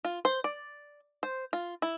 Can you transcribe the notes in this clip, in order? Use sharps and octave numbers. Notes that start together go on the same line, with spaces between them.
F4
C5
D5
C5
F4
E4